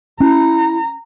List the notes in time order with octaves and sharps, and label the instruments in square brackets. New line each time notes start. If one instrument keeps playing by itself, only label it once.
[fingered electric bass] C#4 [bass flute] E4 [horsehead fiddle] A#5